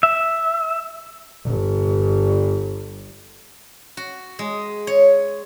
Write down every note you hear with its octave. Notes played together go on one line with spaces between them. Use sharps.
E5
G1 G2
F#4
G#3
C#5